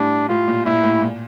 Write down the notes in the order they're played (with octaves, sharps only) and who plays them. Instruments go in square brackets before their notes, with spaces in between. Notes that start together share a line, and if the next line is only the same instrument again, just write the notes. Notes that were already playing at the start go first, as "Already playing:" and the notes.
Already playing: [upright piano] A2 G3 [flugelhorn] D4
[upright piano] A2 [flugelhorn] F4
[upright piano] A#2
[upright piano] A#2 [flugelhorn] E4
[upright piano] A2
A#2